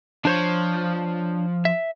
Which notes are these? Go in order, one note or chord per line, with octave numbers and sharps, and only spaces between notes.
F3 D4 C5 C#5
E5